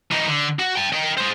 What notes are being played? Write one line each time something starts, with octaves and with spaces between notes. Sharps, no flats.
E3 D#4
D3
F#4
G5 A5
D#5 G5
G#4 C5